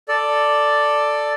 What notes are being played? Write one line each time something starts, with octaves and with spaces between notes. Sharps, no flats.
A4 D5